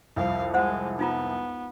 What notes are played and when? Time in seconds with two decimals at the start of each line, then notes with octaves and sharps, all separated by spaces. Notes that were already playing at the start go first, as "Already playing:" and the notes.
0.16 C2 F2 F5
0.54 G#3 C5 F#5
0.99 B3 D#4 F4 A#5